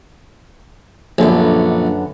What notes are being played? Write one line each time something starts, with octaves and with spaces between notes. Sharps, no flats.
A#1 F#2 D3 B3